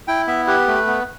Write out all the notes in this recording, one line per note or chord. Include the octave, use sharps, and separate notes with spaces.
E4 G5
B3 E5
G4 B4
A3
B3